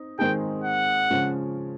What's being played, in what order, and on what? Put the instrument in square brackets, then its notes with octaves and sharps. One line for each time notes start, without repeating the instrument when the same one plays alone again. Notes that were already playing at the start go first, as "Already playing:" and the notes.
Already playing: [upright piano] C4 D#4
[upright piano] D#3 G#3 C4 D#4 G#4 [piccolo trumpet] G5
[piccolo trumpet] F#5
[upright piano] C#3 F3 G#3 C#4